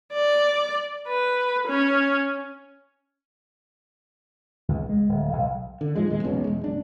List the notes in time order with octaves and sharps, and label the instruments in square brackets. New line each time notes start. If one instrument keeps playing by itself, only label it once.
[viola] D5
B4
C#4
[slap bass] C#2
G#3
D1
B1
[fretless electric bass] D3
A#1 G#2 F3 G#3
D#2 A2 C3 G#3
E1 B1 B2 C#4
E1 G#3
F#1 D4